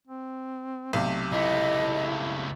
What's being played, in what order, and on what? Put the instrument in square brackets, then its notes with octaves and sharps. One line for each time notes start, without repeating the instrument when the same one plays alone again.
[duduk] C4
[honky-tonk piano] B1 C3 [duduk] A3
[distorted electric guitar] C#2 A3 [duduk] E4 [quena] D#5